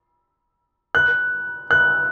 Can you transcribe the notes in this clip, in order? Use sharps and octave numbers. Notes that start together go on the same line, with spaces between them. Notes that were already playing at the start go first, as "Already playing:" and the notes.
F#6
F#6